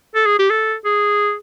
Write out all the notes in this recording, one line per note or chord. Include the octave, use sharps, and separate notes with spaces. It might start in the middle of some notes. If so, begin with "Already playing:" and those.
A4
G#4
G4
A4
G#4